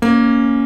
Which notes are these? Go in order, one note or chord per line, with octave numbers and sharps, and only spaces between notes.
A#3 C#4